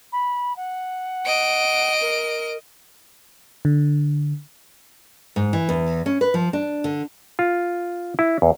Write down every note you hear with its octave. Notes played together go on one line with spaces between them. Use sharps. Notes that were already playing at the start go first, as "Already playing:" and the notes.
B5
F#5
D#5 D7
A#4
D3
G#2
E3
E2
C#4
B4
F3
D4
D3
F4
E4
E2